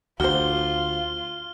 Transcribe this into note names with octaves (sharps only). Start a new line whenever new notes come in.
D2 F4 F#4 C5 F6 G7